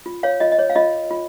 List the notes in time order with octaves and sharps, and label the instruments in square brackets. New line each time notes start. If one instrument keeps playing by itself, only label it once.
[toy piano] F4
C#5 F5
F4 D#5
D#5
C#5
F5
F4 D#5
F4